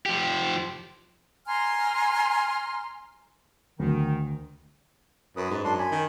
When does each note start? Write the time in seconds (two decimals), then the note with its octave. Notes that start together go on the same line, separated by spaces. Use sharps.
0.06 F3 G4
1.47 G#5 A#5 C6 F6
3.79 D2 D#3
5.37 F#2 B4 D#6
5.50 G#2
5.64 F#2 D4 C6
5.79 G#5 B5
5.91 D#3